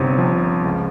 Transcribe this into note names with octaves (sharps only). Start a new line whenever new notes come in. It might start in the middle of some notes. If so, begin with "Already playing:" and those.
Already playing: G1 C3 D#4
F3
C#2